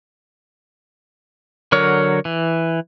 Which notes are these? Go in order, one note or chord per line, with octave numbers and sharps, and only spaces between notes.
D3 F#3 A#4 C#5
E3